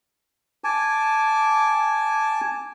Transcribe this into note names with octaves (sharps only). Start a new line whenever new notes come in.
G#5 A5 D6